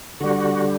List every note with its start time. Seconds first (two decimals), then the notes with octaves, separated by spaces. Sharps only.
0.20 D3 G3 F#4